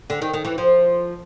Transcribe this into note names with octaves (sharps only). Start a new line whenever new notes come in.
D3
D#3
D#3
E3
F3